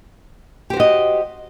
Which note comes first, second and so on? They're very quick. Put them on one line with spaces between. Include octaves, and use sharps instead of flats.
G4 C5 F#4 D#5